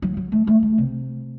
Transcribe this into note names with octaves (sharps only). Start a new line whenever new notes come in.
F#3
F#3
A3
A3
A3
C3